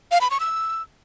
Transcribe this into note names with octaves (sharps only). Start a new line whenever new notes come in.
F5
B5
C#6
E6